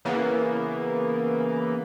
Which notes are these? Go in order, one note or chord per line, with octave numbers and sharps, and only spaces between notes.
C#3 E3 A#3 B3